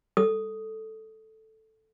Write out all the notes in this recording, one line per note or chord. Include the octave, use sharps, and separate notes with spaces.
A4 D#6